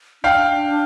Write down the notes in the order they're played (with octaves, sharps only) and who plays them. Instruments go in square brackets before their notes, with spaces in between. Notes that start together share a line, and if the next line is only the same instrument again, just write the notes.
[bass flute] D4 [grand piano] F5 G5